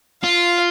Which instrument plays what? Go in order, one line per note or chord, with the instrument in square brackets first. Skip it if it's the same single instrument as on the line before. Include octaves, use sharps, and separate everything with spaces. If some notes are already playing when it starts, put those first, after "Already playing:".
[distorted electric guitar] F4 [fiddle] F5